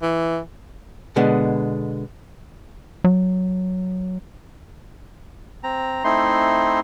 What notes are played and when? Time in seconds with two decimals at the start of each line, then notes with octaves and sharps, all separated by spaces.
0.02 E3
1.16 B2 D3 G#3 B3
3.04 F#3
5.64 C4 A#5
6.04 A3 C4 D#4 E4 C6